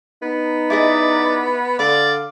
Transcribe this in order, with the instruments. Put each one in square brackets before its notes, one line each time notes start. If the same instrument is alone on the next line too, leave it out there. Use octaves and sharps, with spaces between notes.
[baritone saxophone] B3 [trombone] D#4
[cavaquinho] E4 G#4 D#5 [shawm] D5
[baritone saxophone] D3 [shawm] D5 [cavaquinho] F5